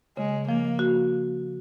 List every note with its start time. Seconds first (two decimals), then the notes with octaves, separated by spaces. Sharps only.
0.17 C#3 G#3
0.47 F3 A#3
0.79 F#4